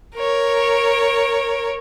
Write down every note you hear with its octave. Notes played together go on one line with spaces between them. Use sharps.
A#4 C#5